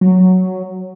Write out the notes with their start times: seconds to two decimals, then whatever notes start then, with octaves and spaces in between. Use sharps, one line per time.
0.01 F#3